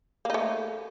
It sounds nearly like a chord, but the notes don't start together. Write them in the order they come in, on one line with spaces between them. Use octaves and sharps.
A#3 D#4 A3